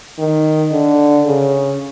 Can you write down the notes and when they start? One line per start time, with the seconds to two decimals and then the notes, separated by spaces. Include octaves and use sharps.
0.18 D#3
0.72 D3
1.26 C#3